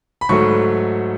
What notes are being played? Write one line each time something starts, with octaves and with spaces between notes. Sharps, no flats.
B5
G#2 F#3 A3 C#6